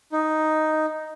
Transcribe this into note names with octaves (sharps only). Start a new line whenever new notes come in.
D#4